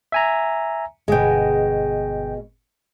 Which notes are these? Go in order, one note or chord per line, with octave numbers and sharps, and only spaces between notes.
E5 G#5 A#5
G1 B2 G#3 G#4 G5